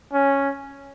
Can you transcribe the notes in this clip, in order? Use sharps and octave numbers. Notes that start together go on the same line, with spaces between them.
C#4